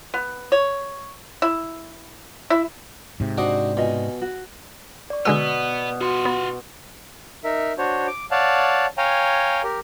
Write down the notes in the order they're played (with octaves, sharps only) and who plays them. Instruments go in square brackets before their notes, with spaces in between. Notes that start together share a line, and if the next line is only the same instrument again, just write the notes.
[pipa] B3
C#5
E4
E4
[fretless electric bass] G#2 C3
[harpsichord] D4 F#4 D#5 [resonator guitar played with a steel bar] C5 D5
[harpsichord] B2 [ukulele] F4 D#5 G#5
[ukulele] F#4
[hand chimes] D5 C#6
[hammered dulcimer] B2 [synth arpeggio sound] D3 G#3 E6 [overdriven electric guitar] B3
[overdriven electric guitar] F4 F#5 [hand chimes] F#4 C6
[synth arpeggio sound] B3
[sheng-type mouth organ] D#4 A#4 E5
D4 F#4 C5 C#5
D6
C#5 D5 F5 F#5 A5
C#5 F5 G5 G#5 A#5
G4 A#4